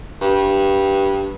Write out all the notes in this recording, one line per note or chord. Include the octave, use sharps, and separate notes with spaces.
G2